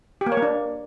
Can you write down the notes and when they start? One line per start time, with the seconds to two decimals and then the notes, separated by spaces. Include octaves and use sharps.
0.21 G4
0.26 A#3
0.32 C#5
0.37 A#3
0.42 D4